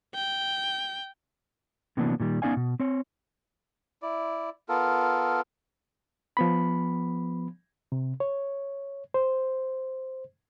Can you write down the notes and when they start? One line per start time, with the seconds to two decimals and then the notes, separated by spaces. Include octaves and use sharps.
0.15 G5
1.97 C3 E3 F#3 A#3 B3 D4
2.20 A#2 D#3 G3
2.42 B3 C#4 D#4 D5 F5 G#5
2.57 B2
2.80 C4 C#5
4.02 E4 D5
4.69 B3 F4 A4 A#4
6.37 F3 B3 B5
7.92 C3
8.20 C#5
9.14 C5